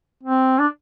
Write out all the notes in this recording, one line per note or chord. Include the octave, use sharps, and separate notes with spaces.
C4
D4